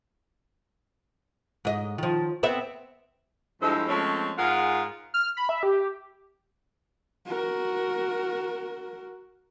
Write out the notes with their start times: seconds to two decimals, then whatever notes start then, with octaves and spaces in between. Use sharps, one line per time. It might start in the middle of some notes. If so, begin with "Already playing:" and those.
1.65 G#2 D#5
1.98 D#3 F3
2.43 B3 C4 E5
3.62 G2 F3 G#3 A3 E4 C5
3.88 F3 G#3 A3 C4 C#4
4.38 G#2 F4 G#4 A#4 F#5
5.14 F6
5.37 B5
5.49 E5
5.63 G4
7.26 F#4 A#4